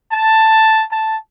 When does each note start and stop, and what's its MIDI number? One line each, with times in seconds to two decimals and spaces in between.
0.11 0.80 81
0.90 1.16 81